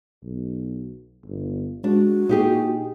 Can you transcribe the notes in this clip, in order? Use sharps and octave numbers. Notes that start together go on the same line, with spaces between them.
B1
G1
G#3 D4 F#4
A#2 D#4 G4 G#4